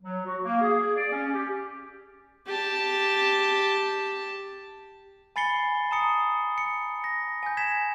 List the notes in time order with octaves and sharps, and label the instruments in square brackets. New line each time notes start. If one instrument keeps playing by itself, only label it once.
[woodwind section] F#3
F#4
A#3
G#4
D5
C#4
G4
[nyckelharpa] G4 A5
[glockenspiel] G#5 B5 A6 C7 C#7 G7
A5 A#5 D#6 C#7
C#7
A#6
G#5 G6
G#6 B6 E7